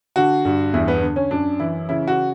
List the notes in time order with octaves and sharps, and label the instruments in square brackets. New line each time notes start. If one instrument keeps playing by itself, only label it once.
[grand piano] D3 F#4
G2
E2 E4
B3
D3
C#4
F#2 D4
E3 E4
C#3 E4
F#4